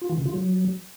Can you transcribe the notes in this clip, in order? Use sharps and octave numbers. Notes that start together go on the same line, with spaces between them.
F4
E3
C#3
F4
F#3